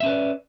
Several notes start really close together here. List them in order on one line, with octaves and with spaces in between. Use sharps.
E5 C#4 B4 D5